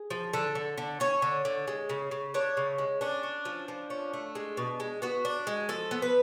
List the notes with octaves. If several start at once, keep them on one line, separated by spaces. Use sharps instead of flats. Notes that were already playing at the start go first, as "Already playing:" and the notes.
Already playing: G#4
F3
D3 A4
D3
D3
C#4 C#5
D3
D3
G#3
C#3
C#3
D4 C#5
C#3
G#3
C#4 D4
C#4
F3
F3
C#4
A3
G#3
B2
G#3
B3 F#4
D4
G#3
F3 A4
B3
B4